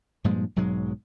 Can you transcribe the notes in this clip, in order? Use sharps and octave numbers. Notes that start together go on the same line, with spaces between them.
G2 A#2 F3 G#3
B1 G#2 F#3 G#3